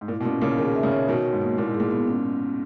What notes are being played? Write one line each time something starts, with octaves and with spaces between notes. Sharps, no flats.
G#2
A#2 E4
B2
A#2 C#4
A#2 C#3 C#4
B2 D#3 G#4
E5
A#2 C#3
C#5
B2 D#3 F#4
F#4
G#2
A#3
A#2 E4
G#2
G#4
A#2
B3
C#4